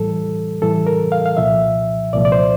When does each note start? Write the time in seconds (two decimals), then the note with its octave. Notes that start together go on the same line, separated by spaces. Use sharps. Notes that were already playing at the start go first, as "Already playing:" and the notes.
Already playing: A2 E3 G3 A4
0.62 A2 E3 G3 A4
0.87 A#4
1.12 F5
1.26 F5
1.37 C2 A#2 F3 E5
2.13 C2 A#2 F3 D5
2.25 D5
2.32 C5